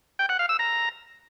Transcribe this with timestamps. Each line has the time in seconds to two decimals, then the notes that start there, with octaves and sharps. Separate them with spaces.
0.19 G5
0.29 F#5
0.39 F5
0.49 E6
0.59 A#5